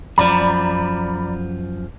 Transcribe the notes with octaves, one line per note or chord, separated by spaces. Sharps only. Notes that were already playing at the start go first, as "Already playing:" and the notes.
F#2 F3 D5 A#5 B5